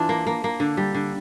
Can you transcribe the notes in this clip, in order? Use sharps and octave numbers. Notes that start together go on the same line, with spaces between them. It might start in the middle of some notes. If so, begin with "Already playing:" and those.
Already playing: E3 D4 F4
A#3
A#3
A#3
D3
G3
D3